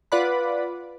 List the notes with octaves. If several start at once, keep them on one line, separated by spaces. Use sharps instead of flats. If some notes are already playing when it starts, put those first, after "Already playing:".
F4 B4 D5 F#5 B5